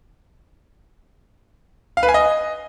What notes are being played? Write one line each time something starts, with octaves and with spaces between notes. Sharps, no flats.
F5
B4
G#5
D#5